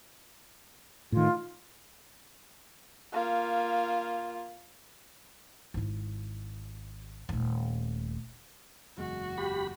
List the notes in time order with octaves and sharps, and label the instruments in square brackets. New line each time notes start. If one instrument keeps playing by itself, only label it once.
[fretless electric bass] A2 D#3 [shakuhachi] F4
[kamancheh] A#3 F4
[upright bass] G#1 E4
D#1 A3
[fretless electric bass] F#1 E2 G#3 [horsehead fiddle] F#4
[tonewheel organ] G4 B5